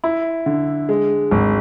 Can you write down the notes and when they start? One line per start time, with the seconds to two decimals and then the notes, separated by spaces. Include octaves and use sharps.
0.04 E4
0.46 D3
0.89 G#3
1.31 G#1